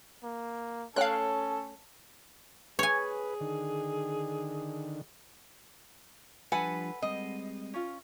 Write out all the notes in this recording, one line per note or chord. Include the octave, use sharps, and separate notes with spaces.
A#3
A3 C#4 A4 C#5 F5 G5 F#6
G#4 B4 C#5 G#5
D3 D#3
F3 G3 D4 A4 B4 F#5 G#5
G3 G#3 C4 D#5
C#4 F4